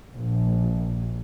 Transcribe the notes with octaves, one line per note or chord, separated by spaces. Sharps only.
A#1